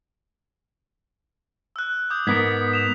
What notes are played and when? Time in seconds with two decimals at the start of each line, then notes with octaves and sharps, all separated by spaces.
1.76 E6 F#6
2.10 D6 D#6 G6
2.27 G#2 B3 A#4 G#6 B6
2.73 E7 F7